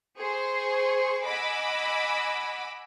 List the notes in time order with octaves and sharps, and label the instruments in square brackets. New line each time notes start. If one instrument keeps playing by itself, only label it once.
[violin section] G#4 C5 C6 C#6
D#5 F#5 G#5 B5 D6 E6